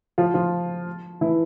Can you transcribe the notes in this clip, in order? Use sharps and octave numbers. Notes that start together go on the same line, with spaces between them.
F3 F4
F3 F4
E3 E4